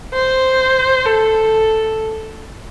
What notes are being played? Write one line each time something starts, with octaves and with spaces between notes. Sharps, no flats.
C5
A4